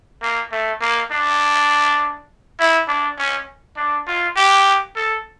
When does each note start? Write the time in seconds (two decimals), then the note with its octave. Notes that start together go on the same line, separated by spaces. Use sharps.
0.22 A#3
0.52 A3
0.81 A#3
1.11 D4
2.60 E4
2.88 D4
3.18 C#4
3.77 D4
4.07 F4
4.36 G4
4.96 A4